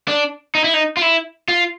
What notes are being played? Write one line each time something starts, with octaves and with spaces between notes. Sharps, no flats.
D4
D#4
E4
D#4
F4
E4
F4